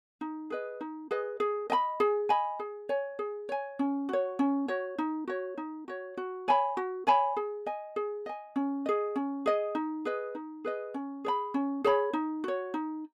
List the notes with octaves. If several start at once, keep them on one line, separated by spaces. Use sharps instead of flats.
D#4
G#4 B4 D#5
D#4
G#4 B4 D#5
G#4
D#5 G#5 B5
G#4
D#5 G#5 B5
G#4
C#5 G#5
G#4
C#5 G#5
C#4
F#4 C#5
C#4
F#4 C#5
D#4
F#4 C#5
D#4
F#4 C#5
F#4
C#5 G#5 B5
F#4
C#5 G#5 B5
G#4
D#5 G#5
G#4
D#5 G#5
C#4
G#4 D#5
C#4
G#4 D#5
D#4
G#4 B4 D#5
D#4
G#4 B4 D#5
C#4
G#4 C#5 B5
C#4
G#4 C#5 B5
D#4
F#4 C#5
D#4